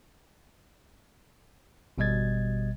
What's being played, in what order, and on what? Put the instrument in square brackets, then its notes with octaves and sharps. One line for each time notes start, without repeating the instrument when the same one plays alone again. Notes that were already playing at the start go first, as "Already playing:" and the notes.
[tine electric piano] G#1 B2 G3 D#5 G#6 A6